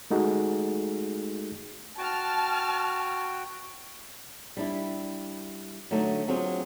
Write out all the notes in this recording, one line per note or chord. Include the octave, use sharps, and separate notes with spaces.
G#3 A3 D#4 F#4 G#4 A4
F#4 G5 A5 F6
G3 D4 E4
D3 F#3 A3 D4 D#4
F#3 C4 D4 F4 G#4